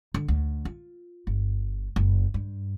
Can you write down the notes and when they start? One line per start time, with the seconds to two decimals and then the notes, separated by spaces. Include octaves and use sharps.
0.14 D3
0.28 D2
0.65 F4
1.27 G1
1.96 F#1
2.34 G2